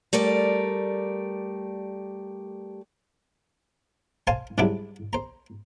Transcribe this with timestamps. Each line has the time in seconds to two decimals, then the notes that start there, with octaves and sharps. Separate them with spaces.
0.13 G3 A3 A#4 D5
4.27 C5 F5 G#5 A5
4.58 G#2 C3 F#3 G3 D4 E4
5.13 C5 A#5